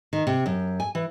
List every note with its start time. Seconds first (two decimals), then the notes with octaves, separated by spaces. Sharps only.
0.13 D#3
0.27 C3
0.46 F#2
0.80 G#5
0.95 E3